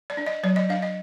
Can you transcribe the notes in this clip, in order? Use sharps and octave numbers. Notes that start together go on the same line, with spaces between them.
D5
D4
D#5
F#3 D5
D#5
D4 F5
D#5